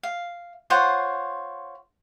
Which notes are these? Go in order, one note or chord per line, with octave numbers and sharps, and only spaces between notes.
F5
F4 C5 C#5 F#5